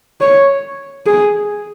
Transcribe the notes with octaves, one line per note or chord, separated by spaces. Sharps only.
C#5
G#4